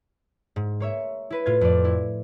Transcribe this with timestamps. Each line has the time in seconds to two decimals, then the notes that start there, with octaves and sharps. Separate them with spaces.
0.56 G#2
0.80 A#3 C#5 E5
1.30 E4 B4 B6
1.46 A2 F4 F5 G#6
1.61 F2 D5
1.85 E4